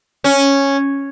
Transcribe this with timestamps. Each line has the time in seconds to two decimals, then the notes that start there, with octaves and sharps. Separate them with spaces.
0.24 C#4